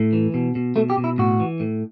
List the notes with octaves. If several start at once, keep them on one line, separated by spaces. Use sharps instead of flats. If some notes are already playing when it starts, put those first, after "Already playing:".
Already playing: A2
E3
B2
B2
B2 A3
G4
B2
E4
A2 F#4
E3
A2